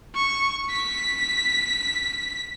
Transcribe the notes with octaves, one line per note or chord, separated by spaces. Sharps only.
C#6
B6